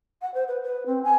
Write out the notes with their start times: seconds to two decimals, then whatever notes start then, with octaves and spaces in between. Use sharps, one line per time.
0.22 F#5
0.34 C5
0.48 B4
0.63 B4
0.86 C4
1.04 G#5